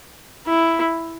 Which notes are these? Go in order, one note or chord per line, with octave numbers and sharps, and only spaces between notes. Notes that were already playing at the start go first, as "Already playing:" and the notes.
E4